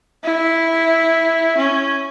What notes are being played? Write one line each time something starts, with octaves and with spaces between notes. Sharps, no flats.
E4
C#4